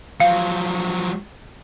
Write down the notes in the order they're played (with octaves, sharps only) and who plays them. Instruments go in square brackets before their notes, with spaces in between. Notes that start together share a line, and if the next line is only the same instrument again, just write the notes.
[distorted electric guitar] F3 F#3 [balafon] F5